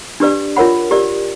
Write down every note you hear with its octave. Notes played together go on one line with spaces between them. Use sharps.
D4 G4 B4 D5
F4 A#4 C#5 F#5 B5
G4 A#4 D5